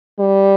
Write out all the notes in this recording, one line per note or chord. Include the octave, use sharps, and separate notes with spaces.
G3